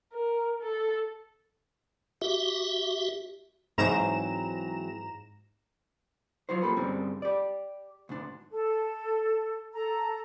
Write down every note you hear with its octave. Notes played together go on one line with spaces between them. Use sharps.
A#4
A4
F#4 G4 E5
G#2 E3 F#3 C4 A#5 E7
F#3 F4 F#4 C5
A#3 F4 G4 A4 B4
G2 D3 G3 G#3 C4 C#4
G4 D5
D2 G#2 D4
A4
A4 A#5